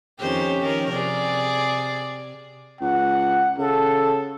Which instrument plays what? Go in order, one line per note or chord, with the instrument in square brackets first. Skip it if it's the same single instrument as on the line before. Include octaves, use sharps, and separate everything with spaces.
[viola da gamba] F2 D#3 C5 [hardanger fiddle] C#4 G4
[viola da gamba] D#3 F3 A#4
[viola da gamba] C3 [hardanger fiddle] G#4 D5
[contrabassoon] C#2 [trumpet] F#5
[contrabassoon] C#3 [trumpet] A4